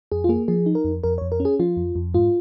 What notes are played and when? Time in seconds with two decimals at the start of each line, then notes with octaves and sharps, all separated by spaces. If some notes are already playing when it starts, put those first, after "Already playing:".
0.12 F2 G#4
0.24 F4
0.29 A#3 G#4
0.48 F3 G#4
0.66 D#4
0.75 A#4
0.85 F2
1.04 F2 A#4
1.18 F2 C#5
1.32 A#4
1.40 C#4
1.45 G#4
1.60 F3 F4
1.77 F2
1.95 F2
2.14 G#2 F4